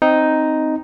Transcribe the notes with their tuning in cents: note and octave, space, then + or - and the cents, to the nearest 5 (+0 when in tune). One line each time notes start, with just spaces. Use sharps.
C4 +0 D#4 +0